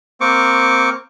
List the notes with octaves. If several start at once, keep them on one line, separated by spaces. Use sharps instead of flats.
A#3 C4 C#6 D6